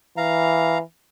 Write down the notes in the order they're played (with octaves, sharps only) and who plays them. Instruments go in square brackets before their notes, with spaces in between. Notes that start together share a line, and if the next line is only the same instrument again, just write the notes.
[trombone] E3 [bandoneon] F5 A#5